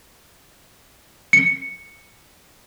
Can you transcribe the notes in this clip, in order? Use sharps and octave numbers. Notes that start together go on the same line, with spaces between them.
C#7